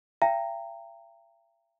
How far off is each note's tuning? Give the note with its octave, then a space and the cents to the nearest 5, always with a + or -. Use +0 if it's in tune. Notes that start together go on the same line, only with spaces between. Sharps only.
E5 +40 G5 +0 A#5 -20